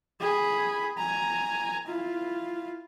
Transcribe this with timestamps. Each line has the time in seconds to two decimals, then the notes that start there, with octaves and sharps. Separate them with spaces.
0.20 G#4 B5
0.97 G#5 A#5
1.86 E4 F4